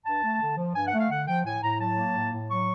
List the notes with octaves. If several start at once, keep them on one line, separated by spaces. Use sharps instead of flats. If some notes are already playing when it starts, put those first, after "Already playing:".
G2 A5
A3
D3
F3
G2 G#5
F#5
A3
F5
D3 F#5
F3 G5
A2 G#5
A2 A#5
F#3 A5
A#3
A2
A2
F#3 C#6